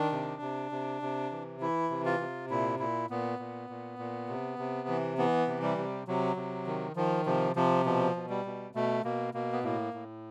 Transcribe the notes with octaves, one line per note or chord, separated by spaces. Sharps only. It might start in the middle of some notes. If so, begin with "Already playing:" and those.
Already playing: D#3 D4
C3
C3
C3
C3
E3
E3 E4
C3
F4
C3
A#2 E4
A#2 E4
A#2 B3
A#2
A#2
A#2
C3
C3
E3
E3 B3
C3
G3
C3
C3 F#3
C3
D#3
D#3 F3
C3 F3
C3 F3
B2 F3
B2
G3
B2
B2 A3
B2 A#3
B2 A#3
B3
A2 A#3
A2